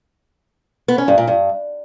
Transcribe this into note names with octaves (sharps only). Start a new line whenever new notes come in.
B3
C#4
G2
A#2
G2